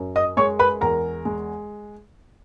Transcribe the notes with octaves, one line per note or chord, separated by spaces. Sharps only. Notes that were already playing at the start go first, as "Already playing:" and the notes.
Already playing: F#2
D#5 D#6
G#3 C#5 C#6
B4 B5
E2 A#4 A#5
G#3